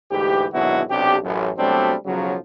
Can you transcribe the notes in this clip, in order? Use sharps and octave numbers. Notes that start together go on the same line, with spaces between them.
D2 G#2 E3 G4
G#1 B2 D3 F#3 E4 F#4
B1 C3 D4 G4
A1 F#2
B2 F#3 G3 A3 C4 D4
B1 C#3 F3 F#3